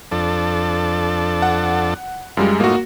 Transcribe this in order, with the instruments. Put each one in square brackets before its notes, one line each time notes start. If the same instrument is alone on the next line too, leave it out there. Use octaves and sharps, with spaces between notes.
[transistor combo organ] F2 D4 A4
[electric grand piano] F#5
[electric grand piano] F#2 G3 G#3 [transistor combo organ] F4
[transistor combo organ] A2 D#4 F4 [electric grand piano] A#3 F#4